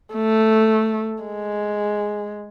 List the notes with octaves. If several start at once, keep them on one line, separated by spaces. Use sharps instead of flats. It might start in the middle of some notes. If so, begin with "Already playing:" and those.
A3
G#3